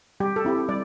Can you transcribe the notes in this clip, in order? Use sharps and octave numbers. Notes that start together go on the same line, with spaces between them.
G3 G4
A4
C4 E4 G4
G3 D5